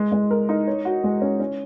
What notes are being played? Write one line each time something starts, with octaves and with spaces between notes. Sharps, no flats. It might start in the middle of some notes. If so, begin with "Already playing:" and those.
Already playing: G#3
G#3
A#4
D#4
C#5
F#4
G#3
C#4
C#4